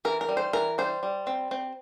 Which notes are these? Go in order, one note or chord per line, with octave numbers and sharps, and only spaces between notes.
E3 A#4
A#4
G3
C5
E3 A#4
G3 C5
G3
C4
C4